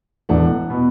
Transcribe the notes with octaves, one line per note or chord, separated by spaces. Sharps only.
E1 E2 E3 A3 D4 F#5
B2 B3